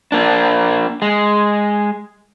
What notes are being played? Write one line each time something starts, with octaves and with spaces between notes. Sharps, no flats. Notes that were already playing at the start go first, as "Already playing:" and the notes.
A#3 D4
G#3